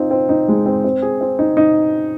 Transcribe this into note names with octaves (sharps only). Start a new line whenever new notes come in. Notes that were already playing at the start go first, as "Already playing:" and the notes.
Already playing: C4 D#4 F4
C4
D#4
G#3
C4
C4
G#4
C4
D#4
D#4